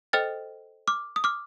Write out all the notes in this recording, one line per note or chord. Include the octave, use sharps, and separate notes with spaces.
A4 C5 D#5 G5 F6 A6
D6 F6
D#6
D6 F6